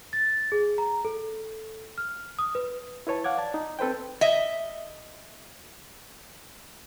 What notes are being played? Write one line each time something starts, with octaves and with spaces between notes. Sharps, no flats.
A6
G#4
A#5
A4
F6
D#6
B4
E4 B4 C#5 A5
F5 F#5 D6 G#6
D5 A5
D#4
C4 A4 B4 C5 G5
D#5 E5